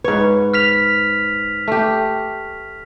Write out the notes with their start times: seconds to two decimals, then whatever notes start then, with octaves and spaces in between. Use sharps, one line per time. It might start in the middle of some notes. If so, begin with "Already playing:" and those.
0.04 G#2 B4 C#5
0.54 F6 B6 F7
1.68 A3 G4